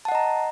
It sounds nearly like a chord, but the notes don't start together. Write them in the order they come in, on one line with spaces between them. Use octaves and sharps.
A5 F#5 D#5 A#5